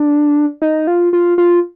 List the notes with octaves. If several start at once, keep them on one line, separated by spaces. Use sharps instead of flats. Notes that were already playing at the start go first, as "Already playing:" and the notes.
Already playing: D4
D#4
F4
F4
F4